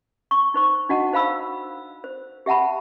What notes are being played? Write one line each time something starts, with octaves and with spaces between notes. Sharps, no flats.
C#6
D#4 C5 C#6
D4 D#4 F#4 D#5 F#5 A5
D#4 C5 F5 B5 E6
C5
G4 E5 F#5 A5 B5